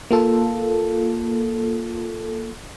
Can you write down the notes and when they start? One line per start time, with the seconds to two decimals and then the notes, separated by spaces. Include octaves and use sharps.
0.11 A#3 F4 A4